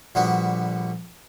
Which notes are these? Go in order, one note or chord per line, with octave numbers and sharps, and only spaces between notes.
A#1 D3 G3 B3 F#4